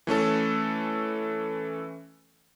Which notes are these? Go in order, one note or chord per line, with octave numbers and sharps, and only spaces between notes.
E3 A3 C#4 A4